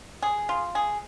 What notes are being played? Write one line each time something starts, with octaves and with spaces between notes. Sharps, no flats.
G#4
F4
G#4